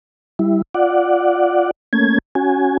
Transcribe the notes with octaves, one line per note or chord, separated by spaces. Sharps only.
G3 E4
F4 D5 F#5
A3 A#3 C#4 G#6
C#4 F#4 G#5